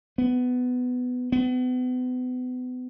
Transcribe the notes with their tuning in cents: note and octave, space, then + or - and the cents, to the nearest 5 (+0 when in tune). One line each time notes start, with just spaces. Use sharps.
B3 +15
B3 +35